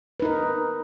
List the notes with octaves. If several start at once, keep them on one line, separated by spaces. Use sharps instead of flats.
D#4 A#4 B4